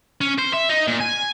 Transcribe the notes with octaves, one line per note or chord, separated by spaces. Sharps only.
C#4
C5
E5
D#4
A#2
G#5